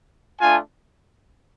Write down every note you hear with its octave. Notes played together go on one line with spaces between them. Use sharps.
A3 D4 F4 G#5